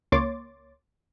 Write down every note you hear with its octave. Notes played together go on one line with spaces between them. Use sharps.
C#2 A#3 C#5 C6 D6 A6